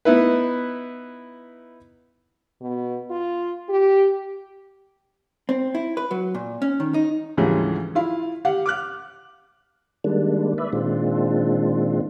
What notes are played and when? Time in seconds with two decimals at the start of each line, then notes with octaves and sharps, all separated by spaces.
0.05 B3 D#4 E4 B4
2.61 B2
3.10 F4
3.69 G4
5.49 C4
5.75 E4
5.97 B4
6.11 F#3
6.35 A#2
6.62 C#4
6.80 D#3
6.94 D#4
7.37 D2 G#2 C#3 E3 F3 G3
7.95 E4 F4 F5
8.45 G4 F5 F#5
8.66 D6 F6 F#6
10.04 D#3 G3 G#3 A#3 D4
10.58 B4 D5 E5
10.73 A#2 D#3 G#3 C4 D4 F4